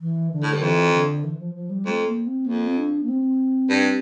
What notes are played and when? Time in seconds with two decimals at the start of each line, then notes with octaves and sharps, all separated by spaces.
0.01 E3
0.32 D3
0.43 A2
0.53 G2
0.62 F2 E3
0.94 D3
1.24 E3
1.39 F3
1.55 F3
1.70 G3
1.85 F2 A3
2.05 A#3
2.27 C4
2.46 F2 A#3
2.66 C4
2.77 D4
3.03 A#3
3.09 C4
3.69 G2